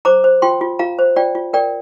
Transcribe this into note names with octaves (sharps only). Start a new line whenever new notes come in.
C5 A#5 D6
C5
F4 G5 C6
F4
F4 F5 A#5
C5
F4 D5 G5
F4
A#4 D5 G5